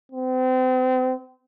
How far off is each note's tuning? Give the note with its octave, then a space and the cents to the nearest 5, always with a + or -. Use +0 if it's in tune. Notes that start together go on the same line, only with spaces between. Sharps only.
C4 -35